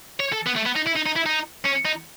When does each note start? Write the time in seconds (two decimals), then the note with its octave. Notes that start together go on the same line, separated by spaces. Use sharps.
0.20 C#5
0.32 A4
0.46 B3
0.56 A3
0.66 B3
0.76 D#4
0.86 E4
0.96 D#4
1.06 D#4
1.16 E4
1.26 D#4
1.66 C#4
1.85 D#4